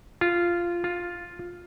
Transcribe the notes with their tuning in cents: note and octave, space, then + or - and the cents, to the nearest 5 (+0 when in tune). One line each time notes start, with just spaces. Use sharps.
F4 -10
F4 +5